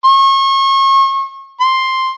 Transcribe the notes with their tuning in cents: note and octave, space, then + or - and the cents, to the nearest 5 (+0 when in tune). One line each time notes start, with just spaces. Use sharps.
C#6 -35
C6 +5